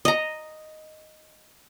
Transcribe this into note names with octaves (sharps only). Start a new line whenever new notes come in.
D#5 A#5